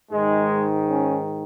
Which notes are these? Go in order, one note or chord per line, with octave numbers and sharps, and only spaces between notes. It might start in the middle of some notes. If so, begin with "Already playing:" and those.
G#2 D#3 G#3
C#4